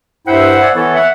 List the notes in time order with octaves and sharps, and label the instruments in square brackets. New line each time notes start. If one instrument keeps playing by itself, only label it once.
[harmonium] G2 E4 G5 [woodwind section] C5 E5 F#5
[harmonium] D5 G#5
[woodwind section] E3 A4 [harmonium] B3 E4 C#5
[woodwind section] E5 F#5